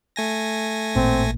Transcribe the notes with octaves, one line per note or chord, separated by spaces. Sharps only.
A3 G#5 A#6
A1 A#2 C4